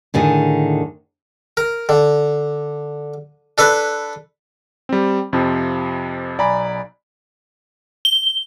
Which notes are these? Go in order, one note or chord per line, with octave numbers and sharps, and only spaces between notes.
A2 D3 D#3 G#4
A#4
D3
D4 A4 B4
G3 C4
F2 C3 F3
B1 D5 G#5 A#5 B5
G7